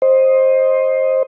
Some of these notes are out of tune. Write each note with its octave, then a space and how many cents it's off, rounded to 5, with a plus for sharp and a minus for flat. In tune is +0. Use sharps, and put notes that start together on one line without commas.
C5 +15 D#5 +0